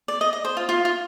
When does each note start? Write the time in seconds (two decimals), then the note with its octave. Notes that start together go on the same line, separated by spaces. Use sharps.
0.08 D5
0.21 D#5
0.33 D#5
0.45 C5
0.57 F4
0.69 F4
0.85 F4